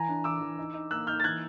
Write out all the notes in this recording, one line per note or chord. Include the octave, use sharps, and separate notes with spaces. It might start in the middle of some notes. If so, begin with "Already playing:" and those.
Already playing: E3 G#5 A#5
D4
E3 D6 E6
E3
D#4
D#4
A#3 E6 F#6
D#4 F6 G6
A6
E3 F#6 G#6